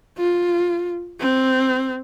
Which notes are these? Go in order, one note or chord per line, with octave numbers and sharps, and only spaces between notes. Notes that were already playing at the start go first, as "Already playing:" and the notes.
F4
C4